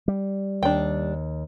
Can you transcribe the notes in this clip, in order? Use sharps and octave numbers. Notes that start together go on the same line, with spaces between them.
G3
D#2 D4 G5